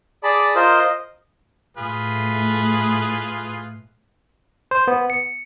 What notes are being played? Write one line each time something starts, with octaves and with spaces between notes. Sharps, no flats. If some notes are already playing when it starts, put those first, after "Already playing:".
G#4 D5 A5 B5
F4 A#4 C5 D#5
A2 A3 F4 G#4 B4
C5
B3
C#7